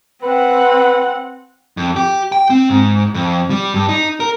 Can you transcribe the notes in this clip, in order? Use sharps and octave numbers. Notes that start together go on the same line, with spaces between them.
C4 B4 F#5
F2
G4
G5
C4
G#2
F2
G3
G2
D#4
A#4